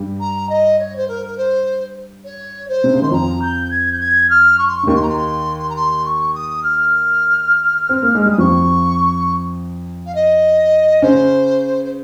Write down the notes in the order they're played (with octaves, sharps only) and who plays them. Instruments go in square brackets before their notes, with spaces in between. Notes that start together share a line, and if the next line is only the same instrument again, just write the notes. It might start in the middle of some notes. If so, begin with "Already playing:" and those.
Already playing: [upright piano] G2 G3
[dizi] A#5
D#5
C#5
C5
A#4
A#4
C5
C#5
C5
[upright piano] C3
C#3
[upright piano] D#3 [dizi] C6
[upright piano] F2 F3 [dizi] A#5
[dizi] G6
G#6
G6
G#6
F6
C#6
C6
C#6
[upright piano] C#3
[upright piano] D#2 D#3 [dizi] C#6
[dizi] C6
A#5
C6
A#5
C6
C#6
D#6
F6
[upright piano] C4
A#3
G#3
[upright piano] G3 [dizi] D#6
[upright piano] F2 F3 [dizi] C#6
[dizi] F5
D#5
[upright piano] C#3 C#4 [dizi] C5
[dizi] C5